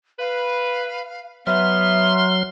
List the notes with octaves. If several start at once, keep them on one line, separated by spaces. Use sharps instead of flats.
B4 F5
F#3 B3 E5 C6 F6